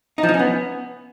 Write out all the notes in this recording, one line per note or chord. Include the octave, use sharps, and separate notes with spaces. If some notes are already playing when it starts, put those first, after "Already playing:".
D#4
F3
D#4
C#4
B3